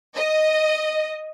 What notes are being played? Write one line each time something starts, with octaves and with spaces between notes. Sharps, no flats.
D#5